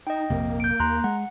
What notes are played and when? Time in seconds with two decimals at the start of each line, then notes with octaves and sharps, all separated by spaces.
0.07 D#4 D#5 G5
0.30 A#1 F2 C3 A#3
0.60 G6 D7
0.80 D#2 A#5 C6 F#6
1.04 G#3 F#5